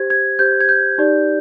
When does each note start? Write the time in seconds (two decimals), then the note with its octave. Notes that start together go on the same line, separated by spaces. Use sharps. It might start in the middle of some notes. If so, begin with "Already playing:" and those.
Already playing: G4 C5 G#6
0.10 G#6
0.39 G4 C5 G6
0.60 G#6
0.69 G6
0.98 D#4 G4 D5